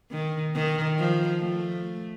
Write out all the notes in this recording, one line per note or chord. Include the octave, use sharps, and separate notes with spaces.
D#3
D#3
F3
A3